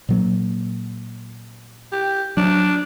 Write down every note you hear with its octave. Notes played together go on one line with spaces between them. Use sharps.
A#2 F#3 A#3
G4
F#3 D4